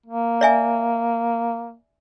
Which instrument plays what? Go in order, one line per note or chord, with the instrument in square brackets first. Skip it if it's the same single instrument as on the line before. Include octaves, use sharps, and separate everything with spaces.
[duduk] A#3
[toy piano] D5 E5 G#5